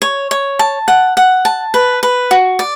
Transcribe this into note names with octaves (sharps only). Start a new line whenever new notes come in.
C#5
C#5
A5
F#5
F#5
A5
B4
B4
F#4
D5